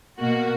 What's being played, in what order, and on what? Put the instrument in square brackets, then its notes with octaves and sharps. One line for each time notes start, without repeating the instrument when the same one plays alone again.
[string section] B2 A#3 F#4